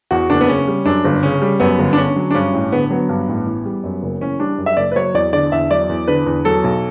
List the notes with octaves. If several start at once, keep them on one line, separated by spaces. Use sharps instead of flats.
E2 F#4
F#1 D4
B3
C#3 C#4
G3
F#2 D4
G1
C#3 C#4
G3
F#2 B3
G1
D4
D3 C#4
F#3
D4
G2 C#4
A1
D3 B3
F#3 B3
G2
A1
E3
G3
F#2
F#1
E3 C#4
G3 D4
F#2
E5
F#1 D5
B4
F#3 C#5
E2 D5
D3 D5
E2 E5
F#3 D5
E2
D3 B4
E2
F#3 A4
B1